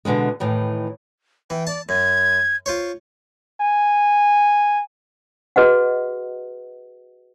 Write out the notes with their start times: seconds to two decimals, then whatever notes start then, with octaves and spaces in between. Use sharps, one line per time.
0.05 B2 D3 E3 G#3
0.40 A2 D#3 E3
1.50 E3 G5
1.67 D5 A5
1.89 F#2 G#6
2.66 F4 C5 C#5
3.61 G#5
5.56 F#4 G#4 B4 D#5 F#5